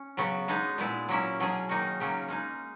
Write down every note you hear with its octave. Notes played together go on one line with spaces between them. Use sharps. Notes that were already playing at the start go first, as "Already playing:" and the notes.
Already playing: C#4
C#3 F#3 B3 F#4
G#3 B3 D#4 G#4
A#2 G#3 B3 E4
F#3 A#3 C#4 E4
B2 F#3 C#4 G#4
D#3 A#3 D#4 F#4
C#3 F#3 A#3 C#4
G#3 D#4 G#4